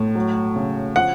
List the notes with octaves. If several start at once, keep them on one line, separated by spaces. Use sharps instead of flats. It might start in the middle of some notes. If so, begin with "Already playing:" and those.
Already playing: A2
F#3
C#3
F3 F#5